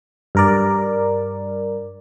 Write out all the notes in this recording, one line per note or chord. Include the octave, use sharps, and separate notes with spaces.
G2 A#4 D5